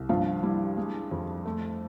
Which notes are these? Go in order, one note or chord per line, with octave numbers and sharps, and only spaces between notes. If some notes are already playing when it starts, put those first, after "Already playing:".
Already playing: C2
G2 F3 F4
G3 E4
G#3
F2
A3